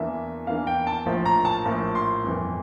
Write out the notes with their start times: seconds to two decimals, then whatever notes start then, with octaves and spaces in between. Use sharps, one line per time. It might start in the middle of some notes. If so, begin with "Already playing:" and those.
Already playing: E2 E3 A#3 D4 E5
0.47 E2 E3 A#3 D4 F5
0.67 G5
0.87 A5
1.06 A#1 A2 F3 A#3
1.26 A#5
1.45 A5
1.65 A#1 A2 F3 A#3
1.95 C6
2.24 G1 F2 E3